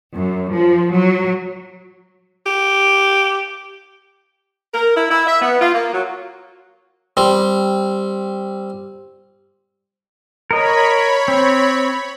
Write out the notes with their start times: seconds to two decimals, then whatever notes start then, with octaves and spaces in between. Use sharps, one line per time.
0.15 F#2
0.54 F3
0.92 F#3
2.46 G4
4.74 A#4
4.95 E4
5.09 E4
5.26 E5
5.41 B3
5.60 F4
5.73 A#3
5.92 F#3
7.17 G3 C4
10.51 A#4 C#5 D#5 B5
11.28 C4